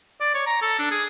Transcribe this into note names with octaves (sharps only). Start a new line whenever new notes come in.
D5
C#5
A#5
A4
D4
G#4